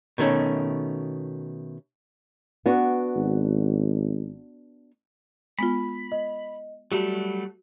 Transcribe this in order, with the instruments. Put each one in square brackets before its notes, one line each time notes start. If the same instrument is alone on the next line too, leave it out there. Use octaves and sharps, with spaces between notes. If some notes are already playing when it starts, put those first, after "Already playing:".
[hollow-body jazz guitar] B2 D#3 A3 C#4
[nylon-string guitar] B3 D4 F#4
[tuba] G#1
[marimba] G#3 B3 F4 [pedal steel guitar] B5
[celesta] D#5
[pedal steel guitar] F#3 G3 A3 [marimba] F#4 [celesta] G4